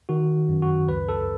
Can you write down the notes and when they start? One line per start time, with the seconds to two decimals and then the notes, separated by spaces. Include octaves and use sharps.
0.09 D#3 F#4
0.49 F#2
0.62 F#4
0.88 C#2 B4
1.09 A4